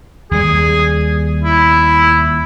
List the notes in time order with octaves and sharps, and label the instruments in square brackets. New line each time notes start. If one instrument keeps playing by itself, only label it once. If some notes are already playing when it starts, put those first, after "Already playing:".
[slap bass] D#2 G3 [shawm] G#4
[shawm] E4